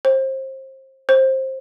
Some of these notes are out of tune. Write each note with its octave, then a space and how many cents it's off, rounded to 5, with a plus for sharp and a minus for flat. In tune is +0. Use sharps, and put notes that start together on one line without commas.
C5 +30
C5 +20